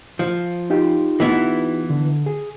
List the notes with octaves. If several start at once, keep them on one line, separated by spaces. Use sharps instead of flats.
F3
D#4 F4 G4
E3 B3 E4
D3
G#4